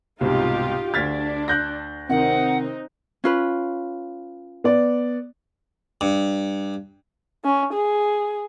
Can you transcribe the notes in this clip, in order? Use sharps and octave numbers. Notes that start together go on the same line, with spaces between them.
C2 G#2 B2 D#4 F4 G4
D2 D4 F6 G#6 A6 B6
F#6 G6 A#6
C3 D#3 C4 D#4 F#5
C#4 F4 B4
B3 D5
G2
C#4
G#4